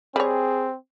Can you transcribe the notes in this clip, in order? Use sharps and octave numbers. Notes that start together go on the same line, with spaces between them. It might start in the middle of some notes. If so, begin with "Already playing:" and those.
G3 C4 G#4 C#5